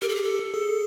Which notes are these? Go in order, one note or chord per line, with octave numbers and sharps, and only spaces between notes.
G4 A#4
A4
G#4
A4
G#4